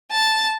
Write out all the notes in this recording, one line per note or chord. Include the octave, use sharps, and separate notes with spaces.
A5